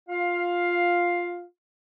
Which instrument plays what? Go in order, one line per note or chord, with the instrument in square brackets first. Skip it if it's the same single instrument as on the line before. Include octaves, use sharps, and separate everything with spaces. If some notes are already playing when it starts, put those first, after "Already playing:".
[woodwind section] F4 F5